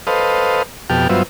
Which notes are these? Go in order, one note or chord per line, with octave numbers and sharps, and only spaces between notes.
A4 B4 C5 D#5 F5
F2 B2 G4 G5 A5 F6
G2 F#3 B3 F4 C5 E5